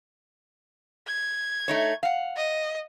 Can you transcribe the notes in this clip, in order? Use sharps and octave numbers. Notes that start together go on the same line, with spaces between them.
G#6
A3 D#4 C#5
F5 F#5
D#5